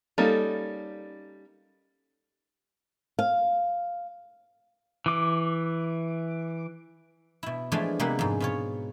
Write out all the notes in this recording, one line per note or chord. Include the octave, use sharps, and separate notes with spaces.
G3 A#3 C#4 D#4 A4
F5
E3 D6
B2 E4
E3 F3 G#3 A3 D4 F4
C3 G#3 A#3 B3 G4 F#5
F2 G#2
B2 F4 C#5